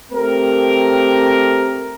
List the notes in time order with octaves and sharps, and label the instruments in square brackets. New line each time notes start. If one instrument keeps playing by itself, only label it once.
[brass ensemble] A3 C4 G4 A#4